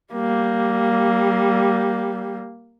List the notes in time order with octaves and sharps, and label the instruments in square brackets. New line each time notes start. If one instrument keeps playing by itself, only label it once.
[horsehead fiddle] G3 A#3